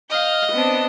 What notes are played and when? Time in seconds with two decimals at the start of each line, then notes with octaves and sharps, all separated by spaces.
0.10 D#5 F5 F6 G6
0.52 B3 C4 D4